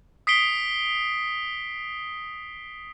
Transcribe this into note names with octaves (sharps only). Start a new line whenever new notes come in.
D#6 B6 C7 D7 G7